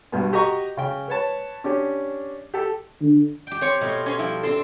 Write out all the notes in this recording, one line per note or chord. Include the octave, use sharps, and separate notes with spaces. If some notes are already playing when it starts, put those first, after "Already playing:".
G2 B2
F#4 G4 D#5 A#5 C#6
C#3 G5
B4 C#5 A5
C#4 D4 G4
G4 A4 G5
D3
G4 G5
C4 C#5
B2 A3 F4
C#4 C5
F3 G3 E4
C4 D4 A4 C6